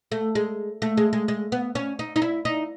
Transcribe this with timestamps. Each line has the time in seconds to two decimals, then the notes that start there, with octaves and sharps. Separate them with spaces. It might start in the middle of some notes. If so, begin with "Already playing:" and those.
0.12 A3
0.35 G#3
0.82 A3
0.97 G#3
1.13 G#3
1.28 G#3
1.52 B3
1.75 C#4
1.99 D#4
2.16 D#4
2.22 E4
2.45 D#4